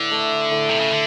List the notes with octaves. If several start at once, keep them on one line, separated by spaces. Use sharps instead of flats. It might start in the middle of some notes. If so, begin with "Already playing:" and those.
Already playing: A2 D3 E3
A3
A2
C3
C#3
D3